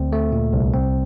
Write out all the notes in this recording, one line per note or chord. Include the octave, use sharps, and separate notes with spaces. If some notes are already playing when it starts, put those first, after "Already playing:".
Already playing: D2 C4
A3
A#2
C2
C4